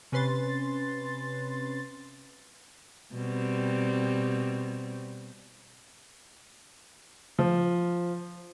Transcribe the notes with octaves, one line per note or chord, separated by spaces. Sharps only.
C3 C#4 B4 C6 A6
B2 G3 C4
F3